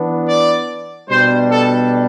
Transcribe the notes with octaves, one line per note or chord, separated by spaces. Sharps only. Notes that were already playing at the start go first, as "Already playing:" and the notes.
Already playing: E3 B3 D4
D5
B2 G3 D4 C5
A4